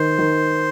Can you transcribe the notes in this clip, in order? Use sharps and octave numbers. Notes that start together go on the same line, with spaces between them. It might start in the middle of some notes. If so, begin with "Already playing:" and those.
Already playing: D#3 C5
D#3